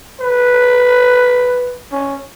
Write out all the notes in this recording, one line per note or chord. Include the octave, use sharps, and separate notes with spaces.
B4
C#4